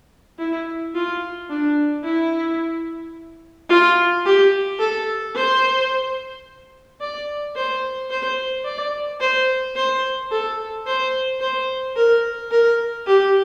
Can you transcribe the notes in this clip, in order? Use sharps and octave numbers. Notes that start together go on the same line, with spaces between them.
E4
F4
D4
E4
F4
G4
A4
C5
D5
C5
C5
D5
C5
C5
A4
C5
C5
A#4
A#4
G4